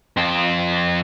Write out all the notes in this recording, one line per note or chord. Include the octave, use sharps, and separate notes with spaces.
F2 C4